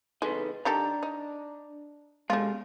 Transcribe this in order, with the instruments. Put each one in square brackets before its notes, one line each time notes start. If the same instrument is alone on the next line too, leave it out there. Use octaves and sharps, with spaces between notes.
[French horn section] C#3 E3 A3 [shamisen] G#3 [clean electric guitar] D#4 A4 B4
[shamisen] D#3 G4 A4 [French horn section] D4 [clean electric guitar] A#5
[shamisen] D#4
[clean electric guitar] B2 G#3 [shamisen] A3 F4 [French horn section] C#4 G4